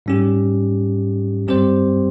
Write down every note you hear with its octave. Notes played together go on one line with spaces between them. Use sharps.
G#2 G3 C#4 G4
G2 G3 C4 G4 C5